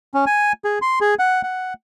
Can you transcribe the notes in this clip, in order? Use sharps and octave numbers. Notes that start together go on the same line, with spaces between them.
C#4
G#5
G#4
C6
G#4
F#5
F#5